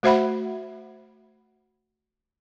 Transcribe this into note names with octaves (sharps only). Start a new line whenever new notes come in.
A3 F#4 C5 E5 F#5 B5